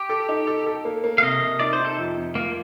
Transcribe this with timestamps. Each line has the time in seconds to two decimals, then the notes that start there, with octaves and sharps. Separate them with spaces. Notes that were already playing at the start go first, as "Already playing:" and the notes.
Already playing: G4
0.09 A4
0.29 D#4
0.47 A4
0.66 A4
0.85 A#3
1.04 A#3
1.18 F5
1.22 C3 D#5
1.42 C3
1.60 D#4 D5
1.73 C5
1.79 D#4
1.85 A4
1.98 F2
2.17 F2
2.35 A#3 F4